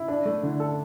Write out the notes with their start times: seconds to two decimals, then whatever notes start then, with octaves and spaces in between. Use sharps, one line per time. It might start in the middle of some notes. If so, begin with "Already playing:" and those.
Already playing: E4
0.08 D4
0.25 A3
0.43 D3
0.60 A4